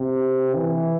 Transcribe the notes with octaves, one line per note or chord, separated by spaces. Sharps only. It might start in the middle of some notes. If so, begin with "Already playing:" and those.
Already playing: C3
E3